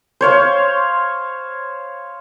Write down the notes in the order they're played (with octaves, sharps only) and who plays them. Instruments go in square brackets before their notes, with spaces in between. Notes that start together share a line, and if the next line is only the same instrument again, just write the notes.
[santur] C5 C#5 F5